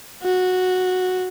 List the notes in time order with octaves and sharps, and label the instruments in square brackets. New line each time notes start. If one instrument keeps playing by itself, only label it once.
[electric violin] F#4